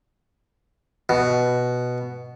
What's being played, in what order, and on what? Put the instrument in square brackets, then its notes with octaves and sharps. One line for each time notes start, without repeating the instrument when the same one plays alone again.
[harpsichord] B2